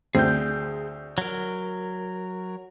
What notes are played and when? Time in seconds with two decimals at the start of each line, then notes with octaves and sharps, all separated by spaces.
0.15 D2 C4 G#4 G6
1.18 F#3 A#4